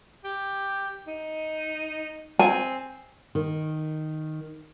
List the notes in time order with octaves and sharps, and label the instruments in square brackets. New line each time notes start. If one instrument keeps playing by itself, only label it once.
[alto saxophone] G4
D#4
[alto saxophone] C4 [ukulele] G#5
[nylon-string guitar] D#3